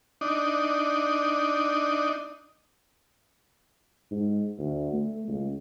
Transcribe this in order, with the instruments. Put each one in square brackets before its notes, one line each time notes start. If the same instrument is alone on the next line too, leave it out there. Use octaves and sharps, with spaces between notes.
[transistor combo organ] D4 D#4
[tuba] G#2
D2
A3
C#2